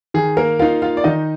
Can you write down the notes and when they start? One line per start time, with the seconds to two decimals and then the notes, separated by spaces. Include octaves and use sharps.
0.14 D#3 G#4
0.37 A#3 A#4
0.59 A#3 D#4 F4 F5
0.82 F4 F5
0.97 D5
1.04 D#3 D#4 D#5